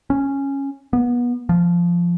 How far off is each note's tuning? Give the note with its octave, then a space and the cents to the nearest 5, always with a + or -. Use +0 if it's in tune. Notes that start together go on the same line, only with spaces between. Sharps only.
C#4 -5
B3 -25
F3 -10